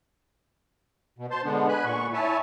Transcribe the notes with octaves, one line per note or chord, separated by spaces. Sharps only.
B2
C5 A5 C6
D3 G#3 B3 D4
G#5 B5 F#6
A#2 C#6
E4 C#5 E5 G#5 A5